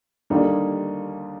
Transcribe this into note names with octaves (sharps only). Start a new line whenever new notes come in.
D#2 D3 G3 A#3 D#4